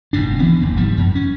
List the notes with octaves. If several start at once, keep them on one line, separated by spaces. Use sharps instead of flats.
F#1 G#2 B2 D4
D#3 E3 B3 C#4
F#1 D#2
G#2 F3 G3
F#2
C#4